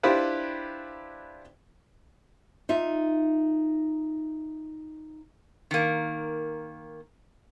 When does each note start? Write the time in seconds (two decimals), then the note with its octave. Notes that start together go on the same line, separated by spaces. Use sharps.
0.03 D4 E4 F4 G4 B4 C5
2.69 D#4 F4 E5
5.71 D#3 A#3